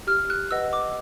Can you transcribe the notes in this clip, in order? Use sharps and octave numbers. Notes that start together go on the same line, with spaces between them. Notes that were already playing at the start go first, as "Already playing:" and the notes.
G4 F6
F#6
B4 D#5 F#5 E6
D6